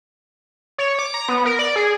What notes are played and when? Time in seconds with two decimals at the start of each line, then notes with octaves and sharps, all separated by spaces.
0.78 C#5
0.99 D6
1.14 A#5
1.29 B3
1.45 A#4
1.59 D5
1.76 G#4